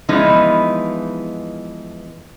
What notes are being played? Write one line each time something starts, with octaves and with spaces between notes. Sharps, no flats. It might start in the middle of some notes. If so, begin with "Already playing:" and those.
E3 F3 G#3 B3 D#4 E4